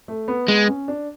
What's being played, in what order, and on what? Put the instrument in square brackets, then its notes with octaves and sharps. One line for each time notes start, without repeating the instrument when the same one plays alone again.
[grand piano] A3
B3
[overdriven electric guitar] G#3 [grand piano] B3
[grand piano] C#4
D4